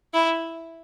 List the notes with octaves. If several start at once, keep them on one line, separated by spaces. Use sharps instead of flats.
E4